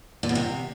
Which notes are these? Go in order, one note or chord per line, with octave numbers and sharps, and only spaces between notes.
A#2
B2
C3